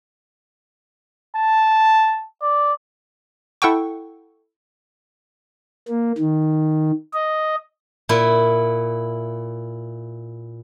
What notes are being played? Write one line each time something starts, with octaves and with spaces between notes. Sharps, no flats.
A5
D5
E4 A4 F#5 G5 C#6
A#3
D#3
D#5
A#2 E4